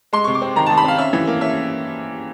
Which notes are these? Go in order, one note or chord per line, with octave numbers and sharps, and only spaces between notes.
G#3 C6
C3 C#6
D6
C4
D#3 A#5
D#3 A5
B5
C4 F5
C#4 E5
E3
A#3
C#4 E5